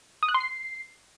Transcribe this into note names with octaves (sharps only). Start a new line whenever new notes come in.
D#6
F#6
C6
C7